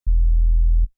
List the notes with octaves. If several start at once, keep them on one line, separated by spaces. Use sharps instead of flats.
E1